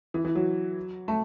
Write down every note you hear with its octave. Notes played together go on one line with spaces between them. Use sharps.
E3
E3
F#3
A3